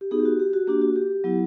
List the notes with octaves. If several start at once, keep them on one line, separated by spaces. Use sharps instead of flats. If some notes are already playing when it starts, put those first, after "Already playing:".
G4
B3 D#4 F#4 G#4
G4
F#4
G4
F#4
A#3 D4 F#4 G4
F#4
G4
F#3 B3 E4